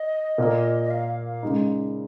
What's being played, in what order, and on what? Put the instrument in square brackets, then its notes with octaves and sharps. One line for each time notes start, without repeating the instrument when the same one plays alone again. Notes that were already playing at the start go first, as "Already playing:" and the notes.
Already playing: [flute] D#5
[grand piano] A#2 A#3 F4 A#4
[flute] D#5
F5
F5
F5
[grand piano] C#3 G#3 D#4